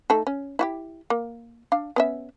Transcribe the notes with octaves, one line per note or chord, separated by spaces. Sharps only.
A3 D#4 A4
C#4
E4 F#4 G4
A#3
D4 F5
B3 C#4 E5